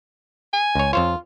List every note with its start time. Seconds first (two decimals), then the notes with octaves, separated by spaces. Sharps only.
0.53 G#5
0.75 C#2 C#5
0.93 F2 F4 C5 C#5